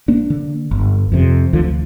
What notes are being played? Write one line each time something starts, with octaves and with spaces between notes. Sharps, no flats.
A#3 D4
D3
G1
F2 C3
D2 D3 F3